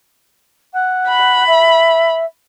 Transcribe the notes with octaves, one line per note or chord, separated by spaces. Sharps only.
F#5
B5
E5